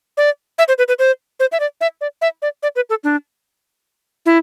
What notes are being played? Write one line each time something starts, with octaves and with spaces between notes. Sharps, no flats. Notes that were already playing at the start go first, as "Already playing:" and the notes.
D5
E5
C5
B4
B4
C5
C5
E5
D5
E5
D5
E5
D5
D5
B4
A4
D4
E4